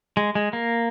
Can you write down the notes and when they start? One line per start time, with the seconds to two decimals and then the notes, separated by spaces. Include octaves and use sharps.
0.17 G#3
0.35 G#3
0.53 A#3